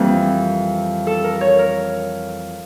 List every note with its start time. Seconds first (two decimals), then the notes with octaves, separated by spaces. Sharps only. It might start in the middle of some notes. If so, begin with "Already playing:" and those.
Already playing: F2 E3 G3 A#3
1.07 A4
1.24 A#4
1.41 C#5
1.59 A#4